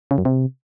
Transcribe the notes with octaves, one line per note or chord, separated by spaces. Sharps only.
C#3
F#2
C3